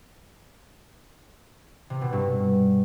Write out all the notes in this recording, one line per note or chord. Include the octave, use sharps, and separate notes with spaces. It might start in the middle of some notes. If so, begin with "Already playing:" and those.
C3
B2
G2